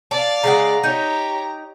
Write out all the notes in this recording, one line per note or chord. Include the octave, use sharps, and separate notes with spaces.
D5 F5 A5
C#3 G#3 F#5 A#5
D#4 G4 C#5